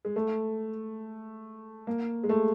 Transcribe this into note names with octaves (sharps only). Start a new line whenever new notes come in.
G#3
A3
A#3
G#3
A3